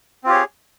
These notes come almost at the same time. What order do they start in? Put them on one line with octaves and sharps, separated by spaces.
C4 F4 G4 C#5 G#4